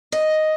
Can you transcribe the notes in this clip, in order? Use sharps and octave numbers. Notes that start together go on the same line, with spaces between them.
D#5